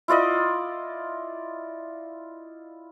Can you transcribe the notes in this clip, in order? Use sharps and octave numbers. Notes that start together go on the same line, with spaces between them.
E4 F4 D5 D#5